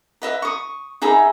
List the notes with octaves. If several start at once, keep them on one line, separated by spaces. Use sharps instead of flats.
B4 D#5 E5
C#6 D#6
D#4 G#4 E5 B5